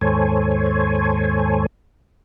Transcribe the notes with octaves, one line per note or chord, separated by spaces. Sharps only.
D#2 G#2 A4 C5 C#5 G#5